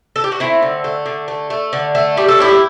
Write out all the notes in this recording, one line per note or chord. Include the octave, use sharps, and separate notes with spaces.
A4
G4
F#4
A3 C4 E4
D3
A3
D3
A3
A3
D3
A3
G3 G4
A4
A2 E4 G4